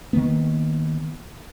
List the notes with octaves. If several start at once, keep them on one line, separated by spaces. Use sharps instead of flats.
D#3 F#3 A#3 B3